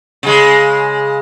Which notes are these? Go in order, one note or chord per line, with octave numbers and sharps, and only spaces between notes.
C#3 G#3